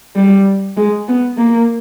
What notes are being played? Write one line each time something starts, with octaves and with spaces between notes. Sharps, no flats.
G3
G#3
B3
A#3